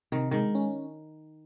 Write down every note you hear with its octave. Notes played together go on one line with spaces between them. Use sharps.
C3 D#3
D#3 G#3
C#4